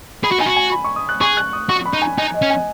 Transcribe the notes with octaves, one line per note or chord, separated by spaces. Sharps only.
G#4 B5
F#4
D#4 G#5
F#4
G#5
B5
C#6
D#6
F#6
G#4 C#6
F#6
D#6
F#4 C#6
B5
D#4
G#5
D#4 G#5
D#5
C#4
G#5